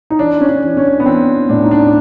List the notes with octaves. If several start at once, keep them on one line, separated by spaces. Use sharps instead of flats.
D#4
E3 D4
C#4
D4
E3
C#4
B3
E3 C4
A2 D4
D#4
D4